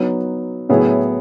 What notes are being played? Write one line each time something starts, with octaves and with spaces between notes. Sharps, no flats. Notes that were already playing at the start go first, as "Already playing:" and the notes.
Already playing: F#3 B3 D#4
A2 F#3 B3 E4 G#4